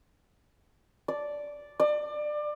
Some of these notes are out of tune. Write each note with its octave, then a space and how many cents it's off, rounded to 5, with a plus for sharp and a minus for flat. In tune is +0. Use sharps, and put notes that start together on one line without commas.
D5 -5
D5 +25